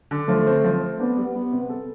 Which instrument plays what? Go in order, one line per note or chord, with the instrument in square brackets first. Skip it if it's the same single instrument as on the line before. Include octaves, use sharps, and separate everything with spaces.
[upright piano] D3
[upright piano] F3 [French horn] A3
[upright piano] C4
F3
C4
[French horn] B3 [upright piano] D4
[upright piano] G3
[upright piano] G3 [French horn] B3
[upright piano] C3
A4